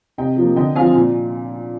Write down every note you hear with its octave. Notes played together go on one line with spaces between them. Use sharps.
C3 D#5 G5
F3 A#3
D3 D#5 G5
F3 C4 F5 G#5
A#2